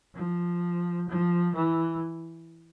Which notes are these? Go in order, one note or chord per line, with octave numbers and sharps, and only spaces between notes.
F3
F3
E3